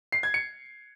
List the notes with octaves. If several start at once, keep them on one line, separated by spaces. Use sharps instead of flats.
C7
G#6
C#7